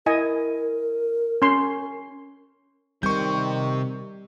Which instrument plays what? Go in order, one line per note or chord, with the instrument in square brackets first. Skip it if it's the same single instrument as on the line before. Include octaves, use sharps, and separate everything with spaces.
[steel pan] E4 D#5 G#5 [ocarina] A#4
[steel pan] C#4 C6
[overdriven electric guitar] C3 C5 [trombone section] D#3 [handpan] G3 [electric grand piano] C#6 G6